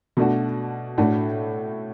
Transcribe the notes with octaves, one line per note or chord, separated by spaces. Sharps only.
B2 A3 D4 F#4
A2 A3 D4 F#4